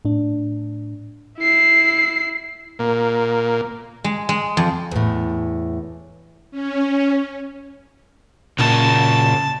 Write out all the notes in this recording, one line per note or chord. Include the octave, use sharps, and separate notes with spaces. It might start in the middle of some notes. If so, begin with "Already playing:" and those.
A2 D4
E4 C7
A#2
G#3
G#3
F2
E2 A2
C#4
A#2 C#3 A#3 A5